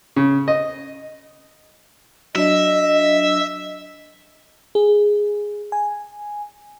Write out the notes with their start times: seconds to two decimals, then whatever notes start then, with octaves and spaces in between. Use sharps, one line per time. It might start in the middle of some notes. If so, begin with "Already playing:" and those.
0.16 C#3
0.48 D#5
2.35 F#3 D4 D#5 E5
4.75 G#4
5.72 G#5